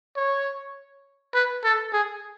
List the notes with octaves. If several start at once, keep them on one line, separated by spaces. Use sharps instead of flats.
C#5
B4
A4
G#4